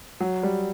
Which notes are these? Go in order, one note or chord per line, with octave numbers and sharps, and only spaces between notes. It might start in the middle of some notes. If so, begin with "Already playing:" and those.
F#3
G3